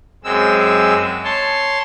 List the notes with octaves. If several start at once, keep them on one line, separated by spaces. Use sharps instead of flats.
F#2 G#3 C4 E6
C#5 A5 C6